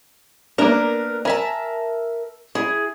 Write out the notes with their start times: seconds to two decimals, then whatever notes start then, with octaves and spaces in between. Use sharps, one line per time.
0.58 A#3 B3 D4 A#4
1.25 A#4 E5 G#5 A5 B5
2.55 E4 G#4